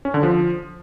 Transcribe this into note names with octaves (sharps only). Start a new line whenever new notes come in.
C#4
D3
F3